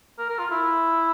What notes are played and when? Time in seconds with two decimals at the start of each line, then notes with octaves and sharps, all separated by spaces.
0.19 A#4
0.29 A#4
0.39 F4
0.51 E4